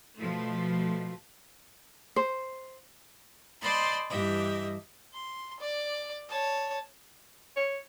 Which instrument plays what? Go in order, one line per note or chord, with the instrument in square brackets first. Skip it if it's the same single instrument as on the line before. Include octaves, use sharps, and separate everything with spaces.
[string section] B2 F3 A3
[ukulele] C5
[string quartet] C5 D5 D#5 A5 B5 C6
G2 E3 G4 D#5 E5
[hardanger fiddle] C6
D5
C#5 A5
[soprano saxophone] C#5